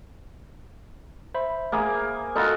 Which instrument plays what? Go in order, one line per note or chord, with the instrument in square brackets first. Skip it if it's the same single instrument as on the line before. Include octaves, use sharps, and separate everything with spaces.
[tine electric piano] C5 E5 B5
[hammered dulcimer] A#3 G#4
[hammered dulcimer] D#4 F4 F#4 [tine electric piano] A4